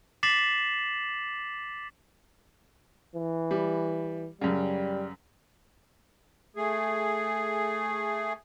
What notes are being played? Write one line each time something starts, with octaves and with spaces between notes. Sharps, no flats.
D6 A6 B6 C7 E7 F#7
E3
G3
F#2 C#3 G3
A3 G#4